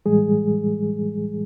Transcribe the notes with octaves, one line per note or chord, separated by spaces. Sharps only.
A2 E3 G3 G#3 G#4